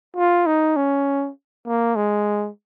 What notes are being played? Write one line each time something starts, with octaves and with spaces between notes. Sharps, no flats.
F4
D#4
C#4
A#3
G#3